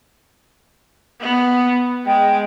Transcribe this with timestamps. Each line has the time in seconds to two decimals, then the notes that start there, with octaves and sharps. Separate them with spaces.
1.21 B3
2.06 G#3 G5